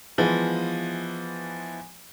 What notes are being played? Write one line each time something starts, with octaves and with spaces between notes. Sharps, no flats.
E3 F3 G#3 B3